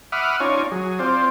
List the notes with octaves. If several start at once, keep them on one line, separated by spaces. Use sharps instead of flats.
E5 F#5 B5 D6 D#6 F6
C#4 D#4 F4 C#5 D5 G#5
F#3 G#4
C4 F4 C5 D5